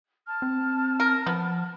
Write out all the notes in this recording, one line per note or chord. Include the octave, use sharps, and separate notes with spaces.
A5 F6
C4
A#4
F3 B3